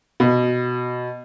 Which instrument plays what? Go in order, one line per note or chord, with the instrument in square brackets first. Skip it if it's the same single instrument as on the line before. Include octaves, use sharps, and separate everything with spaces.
[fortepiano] B2